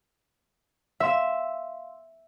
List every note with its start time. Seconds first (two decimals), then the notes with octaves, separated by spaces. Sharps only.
1.00 E5 F5 C6 E6 E7